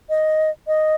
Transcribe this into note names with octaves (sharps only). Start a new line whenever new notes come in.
D#5
D#5